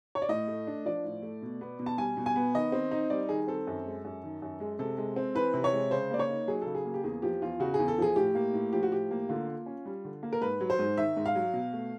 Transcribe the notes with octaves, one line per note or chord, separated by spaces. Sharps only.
C#5
D5
A2 D#5
A3
D4
F3 D5
A2
A3
B2
B3
B2
A5
G3 G#5
B2
G#5
B3
D#3 D#5
C4
D#4
G3 D5
D#3 G#4
C4 A4
F#2
G#3
F#2
D#3
F#2
G#3
C3 A4
G#3
C4
E3 B4
C3
C#5
G#3
C#3 C5
A#3 D5
C#5
D#4
F#3 G#4
C#3 A4
G#4
A#3
G4
E2 G#4
F3 G4
E2 F4
C#3 F#4
E2 G#4
A4
F3 G#4
A2 G4
A#3
A2
F3 G4
F#4
A2 G4
A#3
D3 F4
A#3
C#4
G3
D3
A#3
A#4
G#2 B4
F#3
C5
G#2
D#3 E5
G#2
F5
F#3
B2
A3